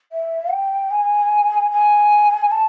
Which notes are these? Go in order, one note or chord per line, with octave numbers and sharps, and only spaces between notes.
E5
G5
G#5
G#5
A5